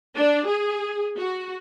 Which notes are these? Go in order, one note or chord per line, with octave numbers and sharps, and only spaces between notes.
D4
G#4
F#4